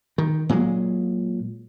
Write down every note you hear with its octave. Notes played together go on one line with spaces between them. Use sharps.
D#3
A#2 F#3 G#3